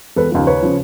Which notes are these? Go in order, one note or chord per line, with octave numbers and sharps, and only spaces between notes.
E1 A4 B4
D#2 C#3 F3
D#2 B4 C#5
C#3 F3